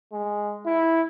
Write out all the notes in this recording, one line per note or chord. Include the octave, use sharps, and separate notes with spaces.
G#3
E4